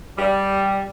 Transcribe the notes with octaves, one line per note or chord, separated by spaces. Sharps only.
G3